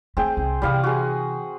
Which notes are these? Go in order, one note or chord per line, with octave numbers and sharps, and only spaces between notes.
A3 C4 G#4 G5
C2
C3 E3 G3 F5 D#6
F#4 G#4